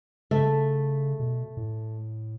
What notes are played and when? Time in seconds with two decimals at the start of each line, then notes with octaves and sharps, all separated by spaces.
0.31 C#3 A3 E5
1.20 B2
1.57 A2